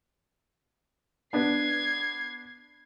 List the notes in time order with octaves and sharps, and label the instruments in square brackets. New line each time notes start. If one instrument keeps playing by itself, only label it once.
[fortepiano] B3 D4 B4 [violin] G#6 C7